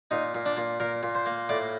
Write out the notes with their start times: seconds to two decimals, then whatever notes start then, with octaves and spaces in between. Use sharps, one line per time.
0.11 A#2 D#4
0.35 A#2
0.46 D4
0.57 A#2
0.80 A#2 A#4
1.03 A#2
1.15 C5
1.26 A#3
1.49 A2 D5